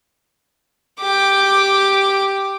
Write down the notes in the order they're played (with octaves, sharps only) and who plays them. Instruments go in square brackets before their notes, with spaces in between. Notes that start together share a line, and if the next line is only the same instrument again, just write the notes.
[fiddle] G4 D6